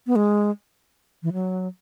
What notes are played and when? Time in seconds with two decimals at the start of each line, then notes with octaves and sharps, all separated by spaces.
0.07 B3
0.16 G#3
1.23 E3
1.33 F#3